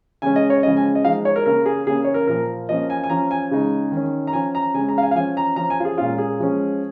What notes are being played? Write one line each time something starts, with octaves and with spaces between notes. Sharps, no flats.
C#3 G#3 C#4 G#5
D#5
C#5
C#3 F3 G#3 C#4 D#5
G#5
D#5
F3 G#3 D#4 F5
C#5
A#4
C#3 A#3 C#4 A#4
G#4
C#3 A#3 C#4 G#4
C#5
A#4
A#2 F3 A#3 A#4
F3 A#3 C#4 D#5
G#5
G#5
F3 C#4 A#5
G#5
C#3 G#3 D#4
D#3 C#4
A#5
F3 C#4 G#5
A#5
C#3 G#3 C#4 G#5
A#5
F5
G#5
F5
F3 C#4 G#5
A#5
F3 C#4 A#5
G#5
F4
G#4
A#2 G#3 C#4 F4
G#4
F3 G#3 C#4